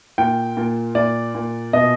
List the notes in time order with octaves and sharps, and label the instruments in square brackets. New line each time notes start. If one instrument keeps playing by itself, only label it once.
[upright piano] A#2 G5
A#2
A#2 D5
A#2
B2 D#5